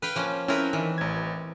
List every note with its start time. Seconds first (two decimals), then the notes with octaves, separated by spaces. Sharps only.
0.02 B4 F5 G5
0.16 F3 A#3 C#4
0.48 C4 C#4 E4 A#4 B4
0.73 D#3 E3
0.98 A1 G#6